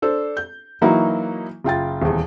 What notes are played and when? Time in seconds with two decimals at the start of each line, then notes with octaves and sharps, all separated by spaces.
0.02 D4 A4 C5
0.37 G6
0.81 E3 F#3 A#3 D#4 E4 F#4
1.64 F#1 F4 G5 A6
2.02 D#1 E2